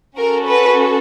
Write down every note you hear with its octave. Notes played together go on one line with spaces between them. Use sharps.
C#4 F#4 A4 A#4
B4